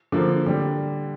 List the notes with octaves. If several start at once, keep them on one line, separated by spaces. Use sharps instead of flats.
D3 F3 A#3
D3 G3